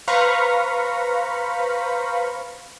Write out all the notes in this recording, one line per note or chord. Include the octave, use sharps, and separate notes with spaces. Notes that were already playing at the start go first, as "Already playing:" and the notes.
B4 C5 F5 A#5 B5 C#6